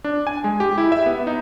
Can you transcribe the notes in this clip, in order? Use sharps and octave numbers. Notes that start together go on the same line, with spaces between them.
D4
G#5
G#3
G4
E4
E5
B3
D#4